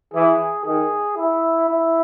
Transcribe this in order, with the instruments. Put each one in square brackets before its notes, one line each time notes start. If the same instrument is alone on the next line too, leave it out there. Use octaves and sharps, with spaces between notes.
[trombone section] E3 [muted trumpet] G#4
[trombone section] D#3 [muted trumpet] G#4
[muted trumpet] E4
E4